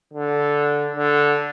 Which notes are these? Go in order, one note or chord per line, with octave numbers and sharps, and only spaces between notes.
D3
D3